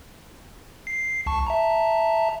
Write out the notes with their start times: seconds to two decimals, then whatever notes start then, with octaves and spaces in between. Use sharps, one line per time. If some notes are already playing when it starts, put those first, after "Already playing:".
0.87 C7
1.26 C2 A5 C#6
1.47 E5 A5 A#5